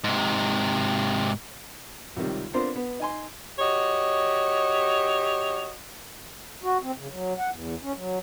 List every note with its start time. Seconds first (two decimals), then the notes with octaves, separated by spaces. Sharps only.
0.04 G#2 C3
2.16 C#2 C3 D#3 G3
2.54 B3 C4 D4 F4 A#4 C5
2.76 B3
3.00 D#4 G#5 C6
3.59 F#4 G4 C#5 D#5
6.63 F#4
6.82 C4
6.98 C#3
7.11 F#3
7.38 F#5
7.50 E2
7.83 C#4
7.96 F#3